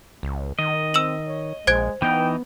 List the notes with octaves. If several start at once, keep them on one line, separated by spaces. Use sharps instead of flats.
C#2
D#3 D#5
C4 E6 E7 F#7
C#5
A#1 G#3 C5 G#6 D7
E3 B3 D#4 G5